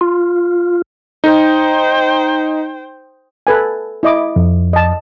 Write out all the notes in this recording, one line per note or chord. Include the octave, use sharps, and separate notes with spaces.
F4
D#4 C5 G5
A4 B4 G#5
E4 D#5 D6
F2
D#5 A5